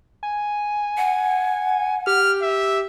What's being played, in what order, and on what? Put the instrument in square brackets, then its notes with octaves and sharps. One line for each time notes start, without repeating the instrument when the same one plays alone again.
[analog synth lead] G#5
[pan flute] F#5
[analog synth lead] G4 [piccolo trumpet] F6
[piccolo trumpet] E5